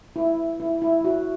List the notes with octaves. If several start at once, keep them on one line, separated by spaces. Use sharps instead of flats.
E4
E4
E4
F#4